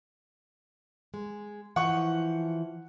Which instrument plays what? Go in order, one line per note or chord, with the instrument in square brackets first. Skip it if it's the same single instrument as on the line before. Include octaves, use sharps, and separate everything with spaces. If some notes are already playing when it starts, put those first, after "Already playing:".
[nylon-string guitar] G#3
[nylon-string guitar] E3 F3 [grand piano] F#5 C#6